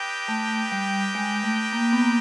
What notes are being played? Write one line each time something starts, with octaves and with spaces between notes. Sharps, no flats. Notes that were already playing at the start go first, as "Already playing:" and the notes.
Already playing: D4 G4 B4 D#5 G5
A3
G3
G#3
A3
A#3
B3
A#3